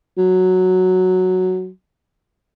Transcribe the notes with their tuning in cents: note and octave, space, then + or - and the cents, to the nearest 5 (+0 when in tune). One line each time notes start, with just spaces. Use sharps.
F#3 +0